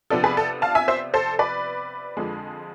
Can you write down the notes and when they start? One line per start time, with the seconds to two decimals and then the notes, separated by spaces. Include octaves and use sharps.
0.10 C3 F3 B3 D4 A4
0.24 G#4 B4
0.37 A4
0.62 F5 A5
0.75 E5 G#5
0.88 C5 E5
1.14 A4 C5
1.39 B4 D5
2.17 F2 D3 F3 G#3